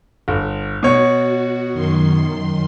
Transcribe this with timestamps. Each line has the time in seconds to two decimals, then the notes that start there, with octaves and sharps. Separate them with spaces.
0.28 G1
0.83 B2 F#4 C#5
1.72 F#2 D#3 C6